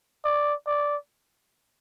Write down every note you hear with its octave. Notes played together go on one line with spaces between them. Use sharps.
D5
D5